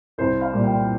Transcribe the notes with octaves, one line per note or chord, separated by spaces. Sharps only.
C2 C5
F5
A#2 G3
G5